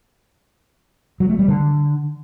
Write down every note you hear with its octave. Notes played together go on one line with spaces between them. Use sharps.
F#3
A3
G3
D3